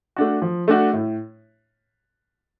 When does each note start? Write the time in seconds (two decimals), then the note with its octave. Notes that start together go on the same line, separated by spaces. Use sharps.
0.16 A3 D4 F#4
0.42 F3
0.68 A3 D4 F#4
0.93 A2